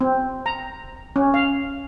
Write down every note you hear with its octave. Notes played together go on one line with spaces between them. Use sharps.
C4
A#5
C#4
F5